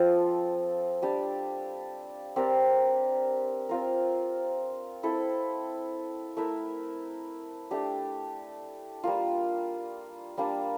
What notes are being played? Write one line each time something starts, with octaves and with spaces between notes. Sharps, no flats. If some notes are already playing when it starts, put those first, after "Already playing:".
Already playing: F3 C4 F4 A4
G3 D4 G4 D5
C4 G4 A#4 D5
C4 F4 A#4
C4 E4 A4
A3 E4 A#4 E5
A3 D4 G4
G3 A#3 F4
G3 A#3 D4